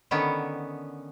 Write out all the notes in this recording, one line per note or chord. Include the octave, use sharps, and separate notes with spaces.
D3 D#3 B3 C#4